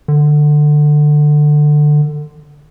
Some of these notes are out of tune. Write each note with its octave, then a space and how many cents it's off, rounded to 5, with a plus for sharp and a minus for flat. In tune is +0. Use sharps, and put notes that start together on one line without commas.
D3 +20